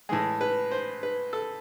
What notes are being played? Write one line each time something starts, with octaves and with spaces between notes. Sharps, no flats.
A2 E3 G#3 G#4
B4
C5
B4
A4